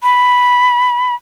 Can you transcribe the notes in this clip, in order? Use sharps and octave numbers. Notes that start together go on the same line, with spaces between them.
B5